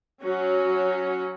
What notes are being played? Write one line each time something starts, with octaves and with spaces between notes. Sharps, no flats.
F#3 C#4 F#4